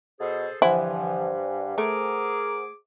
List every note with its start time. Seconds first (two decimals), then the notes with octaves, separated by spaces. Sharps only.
0.20 B2 G#4 A4 C5
0.62 G2 D3 E3 F3 E4 C5 F#5 G#5
1.78 A3 G#4 A#4 D6